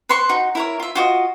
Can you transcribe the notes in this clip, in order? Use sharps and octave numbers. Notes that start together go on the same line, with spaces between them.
B4 C5 C6 C#6
D#4 F#4
E4 A#4 C#5
F4 E5
F4 F#4 D#5